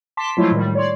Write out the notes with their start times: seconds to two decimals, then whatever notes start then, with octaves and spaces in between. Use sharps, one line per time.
0.17 A5 C6 D6 B6
0.37 F3 F#3 G#3 A3 E4 F4
0.51 A2 D#3 G3
0.75 C#5 D5 C6